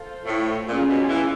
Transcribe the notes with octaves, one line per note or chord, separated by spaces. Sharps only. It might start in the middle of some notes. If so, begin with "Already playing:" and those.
Already playing: F4 A4 C5
A2
A#2 C#4 F4 G#4
B2
E3